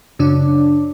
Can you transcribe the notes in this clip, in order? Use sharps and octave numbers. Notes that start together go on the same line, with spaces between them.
F#2 C#3 D4